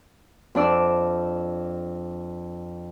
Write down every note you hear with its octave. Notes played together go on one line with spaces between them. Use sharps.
F2 D4 D5 E6